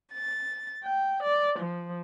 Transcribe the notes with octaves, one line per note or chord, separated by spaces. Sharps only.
A6
G5
D5
F3